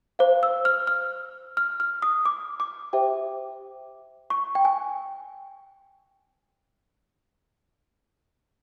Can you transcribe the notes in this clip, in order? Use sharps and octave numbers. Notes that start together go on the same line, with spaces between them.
C5 F5
E6
F6
F6
F6
F6
D#6
D6
D6
G4 C5 E5 G5
C#6
G5
G#5